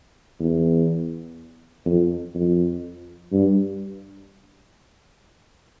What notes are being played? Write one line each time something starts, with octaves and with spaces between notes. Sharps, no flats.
E2
F2
F2
G2